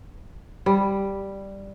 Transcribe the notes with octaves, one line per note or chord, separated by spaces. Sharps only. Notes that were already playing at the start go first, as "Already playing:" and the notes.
G3